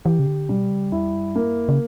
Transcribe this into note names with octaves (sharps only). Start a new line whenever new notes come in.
E3 G4
C#3
D3
B2 G3
C#3
E2 E4
F#2
G2 A#3
F#2
C#3